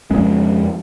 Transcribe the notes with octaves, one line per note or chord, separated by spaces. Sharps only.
F2 G#3 C#4